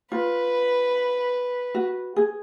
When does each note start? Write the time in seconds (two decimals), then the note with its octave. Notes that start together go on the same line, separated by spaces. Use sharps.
0.11 F4 B4
1.75 F#4
2.16 G#4